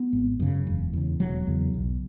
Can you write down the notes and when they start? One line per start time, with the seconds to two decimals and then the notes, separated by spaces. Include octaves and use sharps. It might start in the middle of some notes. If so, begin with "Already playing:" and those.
Already playing: B3
0.13 G#1
0.40 F#2 C#3
0.67 E1
0.93 E2 C#3
1.20 E1 F#3
1.47 E2 C#3
1.74 B1